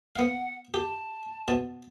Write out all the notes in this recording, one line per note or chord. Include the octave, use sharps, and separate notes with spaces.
B3 F5 F#5
G4 A5
B2 A5